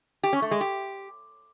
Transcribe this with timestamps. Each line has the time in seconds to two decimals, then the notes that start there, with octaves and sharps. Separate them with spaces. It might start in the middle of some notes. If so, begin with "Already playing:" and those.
0.23 G4
0.33 C#4
0.42 A3
0.51 G#3
0.61 G4